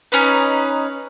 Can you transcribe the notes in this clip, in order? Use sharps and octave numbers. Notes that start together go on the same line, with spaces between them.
C#4 D#4 B4